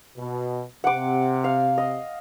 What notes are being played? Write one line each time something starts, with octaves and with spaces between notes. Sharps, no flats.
B2
C3 F#5 D6
F5
D#5